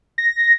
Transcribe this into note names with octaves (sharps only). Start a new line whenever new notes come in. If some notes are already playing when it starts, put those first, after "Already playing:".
A#6